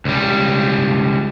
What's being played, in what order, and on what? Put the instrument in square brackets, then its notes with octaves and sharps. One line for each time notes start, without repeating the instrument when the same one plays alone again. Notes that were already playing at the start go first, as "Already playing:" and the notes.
[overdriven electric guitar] C#2 G3